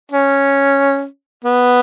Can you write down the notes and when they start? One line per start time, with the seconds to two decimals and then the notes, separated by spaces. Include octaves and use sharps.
0.12 C#4
1.45 B3